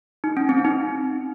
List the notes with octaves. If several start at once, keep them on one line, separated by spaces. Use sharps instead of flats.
D#4
C#4
C4
D#4